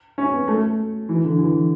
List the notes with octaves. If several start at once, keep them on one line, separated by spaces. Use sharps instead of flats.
C#4
B3
A3
E3
D3
E3